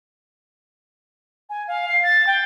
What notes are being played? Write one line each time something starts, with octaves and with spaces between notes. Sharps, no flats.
G#5
F5
C7
A6
G5